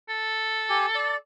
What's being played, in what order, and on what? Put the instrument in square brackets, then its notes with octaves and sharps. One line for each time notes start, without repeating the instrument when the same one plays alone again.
[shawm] A4
[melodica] G4 G#5
D5